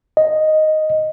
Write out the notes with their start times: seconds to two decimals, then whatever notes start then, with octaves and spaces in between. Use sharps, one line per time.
0.17 D#5